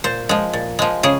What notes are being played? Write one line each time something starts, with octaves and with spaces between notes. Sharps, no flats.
A#2 C5
F3 G#3
A#2
F3 G#3
C#3 G#4